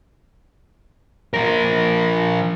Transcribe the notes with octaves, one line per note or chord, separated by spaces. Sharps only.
F3 A#4